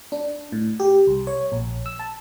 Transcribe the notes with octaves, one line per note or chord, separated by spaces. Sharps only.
D4
A2
G4
C2
C#5
A#1
E6
A5